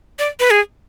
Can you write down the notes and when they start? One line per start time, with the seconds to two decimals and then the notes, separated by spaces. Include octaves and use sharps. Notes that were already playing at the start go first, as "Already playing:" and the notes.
0.19 D5
0.40 B4
0.51 G#4